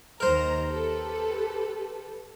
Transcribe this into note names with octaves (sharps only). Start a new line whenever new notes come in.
D#2 A#4 C5 A#5
G4 A4 B4